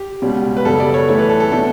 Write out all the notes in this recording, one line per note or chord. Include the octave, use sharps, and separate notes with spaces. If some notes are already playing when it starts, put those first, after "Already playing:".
Already playing: G4
C#2 B2 G3 C#4
B4
F#2 C#3 G3 B3 A4
D5
C#5
A2 E3 A3 C#5
B4
A4
A4
B2 A3 D4 A4